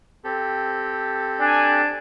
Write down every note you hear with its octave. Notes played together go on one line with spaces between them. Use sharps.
C4 G4 A4
D4 G#5